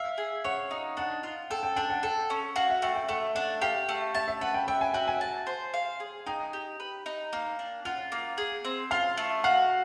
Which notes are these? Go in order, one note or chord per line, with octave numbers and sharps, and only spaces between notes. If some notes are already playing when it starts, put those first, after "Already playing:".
Already playing: E5 F5
G#4
C#5 F#5
D#4
D4 F#5
F4
A4 G5
G5
D4 G5
F#5
A4 G5
C#4
F#4 F5
E5
A3 G5
G5
A3 F#5
D4 F#5
G4 F5
A3
E5 A5
E5
B4 F#5
G5
E5 G5
G#5
F#4 G5
G#5
A5
C5
F5
G#4
D#4 G5
G4
B4
D#4
A#3
D4
F4 F#5
A#3
G#4
C4
F4 F5
A3
F#4 F5